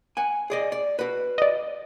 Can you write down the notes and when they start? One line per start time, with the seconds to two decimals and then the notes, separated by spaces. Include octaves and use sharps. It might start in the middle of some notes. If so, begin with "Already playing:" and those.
0.17 F#5 G#5
0.50 G#4 D5 D#5
0.72 D5
0.99 F#4 B4
1.38 D5 D#5